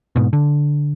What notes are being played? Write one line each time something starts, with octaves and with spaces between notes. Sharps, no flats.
G#2 B2
D3